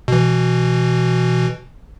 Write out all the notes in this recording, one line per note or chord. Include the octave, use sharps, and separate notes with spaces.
B2 E3